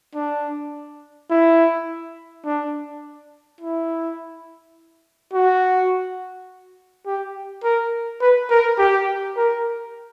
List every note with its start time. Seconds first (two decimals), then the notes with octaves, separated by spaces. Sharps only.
0.15 D4
1.30 E4
2.46 D4
3.61 E4
5.34 F#4
7.06 G4
7.64 A#4
8.22 B4
8.50 A#4
8.79 G4
9.37 A#4